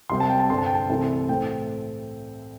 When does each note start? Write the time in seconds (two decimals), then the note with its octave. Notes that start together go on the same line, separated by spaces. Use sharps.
0.10 C2 C3 G3 C4 C6
0.20 A5
0.30 G5
0.40 A5
0.49 G2 D3 C4 C6
0.58 A5
0.66 G5
0.75 A5
0.89 C2 C3 E3 A3 C4
1.29 A2 A3 C4 G5